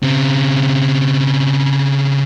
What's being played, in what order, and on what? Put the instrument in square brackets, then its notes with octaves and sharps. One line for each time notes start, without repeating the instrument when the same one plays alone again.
[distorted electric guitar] C#3 C4